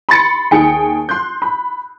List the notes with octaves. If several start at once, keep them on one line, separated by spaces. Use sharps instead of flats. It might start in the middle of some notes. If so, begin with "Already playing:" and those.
B5 C6 A6 C#7
D#2 D#4 G#4 G5 C#7
C6 F#6 G6
B5